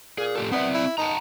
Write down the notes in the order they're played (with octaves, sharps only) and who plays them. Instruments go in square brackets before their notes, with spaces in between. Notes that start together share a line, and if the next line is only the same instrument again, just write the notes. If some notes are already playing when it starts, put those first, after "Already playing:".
[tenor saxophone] A#2 [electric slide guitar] G#4
[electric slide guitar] A2 G4 A4
[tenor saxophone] B3 [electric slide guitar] C4 D5 E5
[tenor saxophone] E4
[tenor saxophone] D#4 [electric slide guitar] F#5 A5 A#5